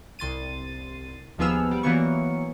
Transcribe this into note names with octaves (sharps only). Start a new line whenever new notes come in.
C2 C6 A6 D#7
D#2 F3 B3 G#4 E6 F6
G3
E3 F#3 A#3 B3 C#6